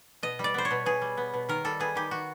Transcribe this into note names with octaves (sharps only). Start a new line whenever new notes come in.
B2 D#5
G3
D5
B3 C5
C#5
B2
B2 G#4
G3
B3
B2
D#3 A#4
G3 A4
B3 G#4
D#3 G4
D#3 F#4